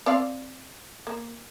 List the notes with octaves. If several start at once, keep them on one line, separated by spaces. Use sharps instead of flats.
C4 D5 F5
A#3